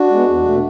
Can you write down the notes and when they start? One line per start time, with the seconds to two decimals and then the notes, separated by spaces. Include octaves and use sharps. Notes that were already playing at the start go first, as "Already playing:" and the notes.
Already playing: D4 F#4
0.11 G#3 B3
0.28 E2
0.45 B2 A3